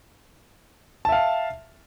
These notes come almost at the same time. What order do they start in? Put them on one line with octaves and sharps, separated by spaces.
A5 E5 F5